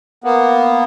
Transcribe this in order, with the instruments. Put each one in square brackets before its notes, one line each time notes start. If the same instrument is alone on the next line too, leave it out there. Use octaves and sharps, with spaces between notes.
[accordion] A#3 B3